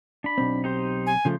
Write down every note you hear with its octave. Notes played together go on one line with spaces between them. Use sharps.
D4 B5
B1 C4
D#4 G4 C5
G#5
C#3 F3 A3 C5